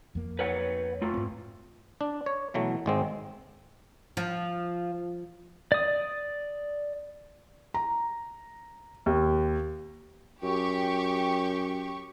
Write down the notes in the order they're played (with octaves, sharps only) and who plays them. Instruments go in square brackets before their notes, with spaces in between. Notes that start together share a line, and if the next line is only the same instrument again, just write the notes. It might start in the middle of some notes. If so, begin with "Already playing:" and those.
[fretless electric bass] F2 A#3
[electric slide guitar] B4 C#5 F#5
A3 F4
[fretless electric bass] G#2 C4
[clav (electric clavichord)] D4
C#5
B2 E3 F#3 A3
G#1 G#3 C4
[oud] F3
[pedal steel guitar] D5 D#6
[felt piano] A#5
D#2
[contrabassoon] F#2 [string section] G4 C#6